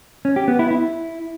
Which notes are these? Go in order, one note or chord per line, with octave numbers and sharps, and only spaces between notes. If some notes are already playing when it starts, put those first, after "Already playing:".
C#4
G4
B3
E4
E4